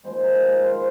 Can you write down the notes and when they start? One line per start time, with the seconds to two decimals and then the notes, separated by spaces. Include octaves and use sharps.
0.04 A#2 F3 G#3 C5
0.23 A#4
0.42 A#4
0.62 C5
0.72 C5